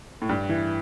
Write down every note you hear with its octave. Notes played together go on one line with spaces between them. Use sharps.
A2
G2
E3